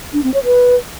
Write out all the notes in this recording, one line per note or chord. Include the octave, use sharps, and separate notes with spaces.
D4
C4
C#5
B4